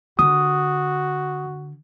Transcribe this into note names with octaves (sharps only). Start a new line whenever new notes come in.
D3 F#4 D#6